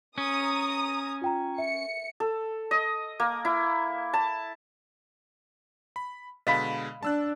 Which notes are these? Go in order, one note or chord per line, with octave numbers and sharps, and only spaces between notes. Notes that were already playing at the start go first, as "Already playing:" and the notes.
C#4 A#5 D#6
F4 G5 A#5
E5 C#7
A4
D#5
A#3
E4
A5
B5
B2 D3 G#3 D#5 F5 B5
D4 A5 E6 F#6